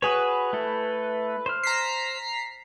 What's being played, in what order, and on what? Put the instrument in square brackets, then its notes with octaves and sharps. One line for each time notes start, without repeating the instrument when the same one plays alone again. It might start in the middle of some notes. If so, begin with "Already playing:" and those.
[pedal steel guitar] F#4 G#4 C#5 [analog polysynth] B4
[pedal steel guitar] A3 E4 A4
C5 F6
[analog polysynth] A#5 B6 C7